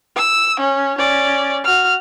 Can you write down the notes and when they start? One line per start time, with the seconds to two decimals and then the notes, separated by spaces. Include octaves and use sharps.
0.16 E6
0.60 C#4
0.98 C#4 D5
1.64 F#4 F6